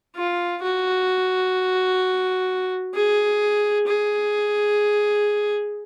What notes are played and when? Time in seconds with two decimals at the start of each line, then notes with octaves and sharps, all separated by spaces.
0.15 F4
0.62 F#4
2.94 G#4
3.86 G#4